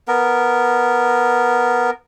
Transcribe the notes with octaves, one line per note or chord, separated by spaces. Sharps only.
B3 A#4